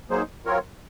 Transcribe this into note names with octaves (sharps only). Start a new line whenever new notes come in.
F#3 A#3 D#4 G#4 C5
F#3 C4 F4 A#4 C#5